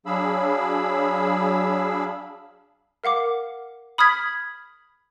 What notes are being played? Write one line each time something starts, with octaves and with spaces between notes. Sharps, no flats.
F#3 D4 G#4 F5 B5 E6
A#4 F5 F#5 D6
B5 D#6 F6 G#6 B6